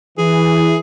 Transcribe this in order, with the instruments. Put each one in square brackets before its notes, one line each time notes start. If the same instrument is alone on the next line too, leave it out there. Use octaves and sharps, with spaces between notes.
[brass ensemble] E3 [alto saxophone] G#4